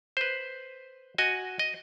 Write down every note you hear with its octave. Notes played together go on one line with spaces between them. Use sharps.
B4 C5
F#4 D#5 G#5
D#5